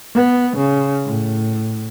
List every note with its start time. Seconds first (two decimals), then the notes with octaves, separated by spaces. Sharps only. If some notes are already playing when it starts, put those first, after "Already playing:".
0.15 B3
0.57 C#3
1.05 A2